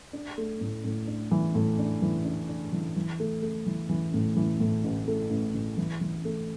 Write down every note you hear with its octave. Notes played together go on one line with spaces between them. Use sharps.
D4
A3
A2
A2
D4
E3
A2
D4
E3
D4
D4
E3
E3
A3
A3
E3
E3
A2
E3
A2
A1
A3
A1
A1
E3
E3
A3